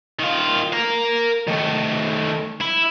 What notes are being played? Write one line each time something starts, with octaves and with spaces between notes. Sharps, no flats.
D#3 F4
A#4 F5
D#3 A3
E4